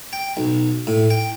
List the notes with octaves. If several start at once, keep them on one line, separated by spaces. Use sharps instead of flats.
G5
B1
A2
G5